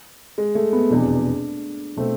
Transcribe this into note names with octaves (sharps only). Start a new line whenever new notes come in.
G#3
A3
B3
F1 E2 B2 D4
B2 A3 C4